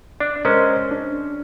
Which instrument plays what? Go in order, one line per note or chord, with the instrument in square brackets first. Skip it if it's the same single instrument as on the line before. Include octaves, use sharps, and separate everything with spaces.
[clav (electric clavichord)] D4 [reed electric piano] D5
[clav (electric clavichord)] G#3 C#4 [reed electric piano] A#4 C5 D#5
[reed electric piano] D4